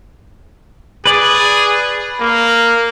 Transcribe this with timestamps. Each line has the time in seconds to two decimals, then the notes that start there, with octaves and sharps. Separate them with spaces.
1.06 G#4 B4 D5
2.21 A#3